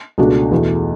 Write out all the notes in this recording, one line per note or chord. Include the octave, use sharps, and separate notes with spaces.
C#2 B2 A3 D4 F#4
E2 B2 A3